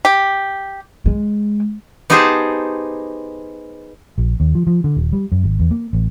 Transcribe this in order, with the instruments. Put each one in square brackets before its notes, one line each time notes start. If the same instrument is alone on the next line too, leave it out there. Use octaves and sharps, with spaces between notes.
[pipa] G4
[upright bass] G#3
[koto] B3 D#4 G4 G#4 C5 A5
[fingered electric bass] A#1
D#2
F3
F3
D3
D#1
G3
F#2
G#1
E2
A#3
A1